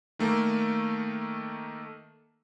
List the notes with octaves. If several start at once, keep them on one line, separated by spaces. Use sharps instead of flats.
D#3 A3 A#3